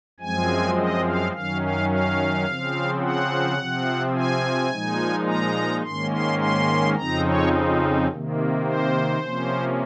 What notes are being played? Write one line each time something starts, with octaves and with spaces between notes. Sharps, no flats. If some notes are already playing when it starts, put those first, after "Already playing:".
F#2 F3 G#3 C4 G#5
D#5
F5
F#2 D#3 F#3 C#4 F5
F5
F5
C#3 F3 C4
F#5
C3 F3 C4
G#5
A#2 F3 G#3 D#4
A#5
G#2 D#3 A#3 C#4 C6
C6
C6
F2 C#3 F3 C4 D#4 A#5
C#5
C3 D#3 A#3
C5
C3 F3 A#3 C#4